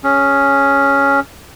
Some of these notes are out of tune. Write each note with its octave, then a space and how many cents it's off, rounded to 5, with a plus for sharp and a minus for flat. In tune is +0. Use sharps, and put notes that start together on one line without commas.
C#4 +5 G#4 +0